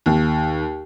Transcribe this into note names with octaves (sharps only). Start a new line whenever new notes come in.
D#2